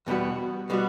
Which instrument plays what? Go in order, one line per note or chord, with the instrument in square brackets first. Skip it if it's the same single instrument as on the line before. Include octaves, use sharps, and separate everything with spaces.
[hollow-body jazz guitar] E2 B2 G3 B3 F#4
B2 G3 B3 F#4